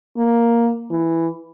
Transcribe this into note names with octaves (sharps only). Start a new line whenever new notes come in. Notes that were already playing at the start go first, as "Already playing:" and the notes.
A#3
E3